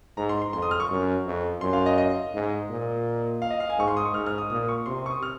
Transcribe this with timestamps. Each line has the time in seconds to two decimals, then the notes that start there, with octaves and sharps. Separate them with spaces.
0.17 G#2 A#5
0.29 C6
0.42 C6
0.53 F2 C6
0.62 D#6
0.71 F6
0.80 C#6
0.90 F#2
1.26 F2
1.61 F#2 C6
1.73 F5
1.86 D#5
1.98 D#5
2.34 G#2
2.70 A#2
3.42 F5
3.51 D#5
3.60 F5
3.70 G#5
3.78 G#2 C#6
3.88 C6
3.97 D#6
4.05 C#6
4.14 G#2 F6
4.26 F6
4.38 D#6
4.50 A#2 D#6
4.68 C#6
4.86 C3 C6
4.99 C6
5.06 C#6
5.10 D#6
5.23 F6